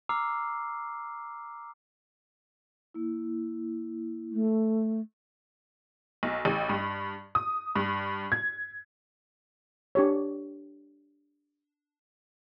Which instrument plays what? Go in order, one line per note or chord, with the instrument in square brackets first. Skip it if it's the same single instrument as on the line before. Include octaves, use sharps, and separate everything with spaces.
[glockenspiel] A#5 D6 E6 F6 C7
[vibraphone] A#3 E4
[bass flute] A3
[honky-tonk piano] B1
A1
G2
D#6
G2
G#6
[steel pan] D4 G4 C#5